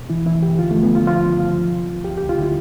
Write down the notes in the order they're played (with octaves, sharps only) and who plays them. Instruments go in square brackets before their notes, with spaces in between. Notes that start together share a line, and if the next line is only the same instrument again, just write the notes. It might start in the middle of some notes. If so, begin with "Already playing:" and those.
Already playing: [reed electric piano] B2
E3 E4
E3 E4
G2 G4
D3 F4
F3 A3
B3
D3 F4
F3 F4
G2
F3
C2
C3
C2
D2 G4
D2 G4
F4
D3 E4